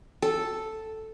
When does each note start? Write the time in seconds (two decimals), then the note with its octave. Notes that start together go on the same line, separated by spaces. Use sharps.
0.22 A4